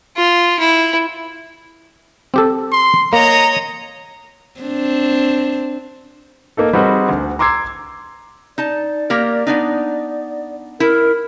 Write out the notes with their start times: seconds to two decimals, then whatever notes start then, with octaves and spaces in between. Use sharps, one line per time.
0.17 F4
0.59 E4
2.34 C4 G4 A4
2.72 C6
3.13 A#3 C#5 D#5 A#5
4.61 C4 D4
6.57 A#3 D#4 A4
6.73 G3 C4 D#4 F#4 G#4 B4
7.09 D2
7.39 A#5 C6 D6 E6 G#6 C7
8.58 D#4 D5 A5
9.10 A#3 G4 A#4
9.47 B3 D4 D#4
10.80 E4 A#4